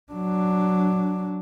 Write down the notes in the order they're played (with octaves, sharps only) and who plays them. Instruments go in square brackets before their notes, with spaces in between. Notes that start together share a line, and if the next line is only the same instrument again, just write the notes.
[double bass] F#3 D4